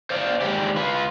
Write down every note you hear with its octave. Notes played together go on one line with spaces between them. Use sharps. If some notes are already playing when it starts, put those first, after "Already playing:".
C5 D5 F5
D#3 G3 G#3 G4
F4 B4